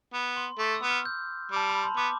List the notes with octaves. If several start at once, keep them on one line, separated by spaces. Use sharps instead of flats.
B3 B5
C6
A3 D6
E6
B3
F6
G6
G3 A5
B5
C6
B3 D6